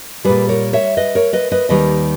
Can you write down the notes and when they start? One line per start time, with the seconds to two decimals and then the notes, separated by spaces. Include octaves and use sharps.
0.24 A#2 G3 G#4 B4
0.49 A#4 C#5
0.73 C#5 E5
0.97 B4 D#5
1.15 A#4 C#5
1.33 B4 D#5
1.52 B4 D#5
1.69 D#2 D#3 G3 B4 D#5